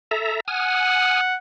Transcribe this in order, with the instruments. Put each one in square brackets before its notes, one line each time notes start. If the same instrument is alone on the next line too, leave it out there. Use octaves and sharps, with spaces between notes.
[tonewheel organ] A4 E5 A#5
[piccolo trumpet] F#5 [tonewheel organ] G#5 D#6 F6